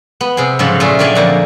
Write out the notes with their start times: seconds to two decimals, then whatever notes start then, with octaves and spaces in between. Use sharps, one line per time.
0.21 B3
0.37 C3 G#4
0.59 G#2 C#3 F3 F#3 A4 C#5
0.80 A#2 A3 E4 F4 G#4
0.99 D#3 F#3 D4 D5 F5 G#5
1.15 F2 D3 A#3